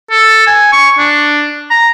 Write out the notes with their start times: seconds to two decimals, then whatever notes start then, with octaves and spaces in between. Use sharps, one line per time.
0.11 A4
0.47 G#5
0.73 C#6
0.99 D4
1.71 A#5